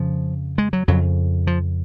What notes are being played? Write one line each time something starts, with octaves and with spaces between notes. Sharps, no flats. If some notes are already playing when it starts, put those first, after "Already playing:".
Already playing: F2 C#3 F3
G#3
F#3
F2 C#3 F#3
F3